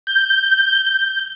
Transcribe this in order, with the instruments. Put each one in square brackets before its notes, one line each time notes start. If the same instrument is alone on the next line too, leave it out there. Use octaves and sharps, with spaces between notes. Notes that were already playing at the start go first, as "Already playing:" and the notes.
[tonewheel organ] G6